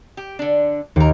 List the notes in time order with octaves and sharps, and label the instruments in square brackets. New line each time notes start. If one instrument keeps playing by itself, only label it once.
[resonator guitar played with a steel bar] G4
D3 D4
[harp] D#2 [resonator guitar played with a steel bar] E3 A#4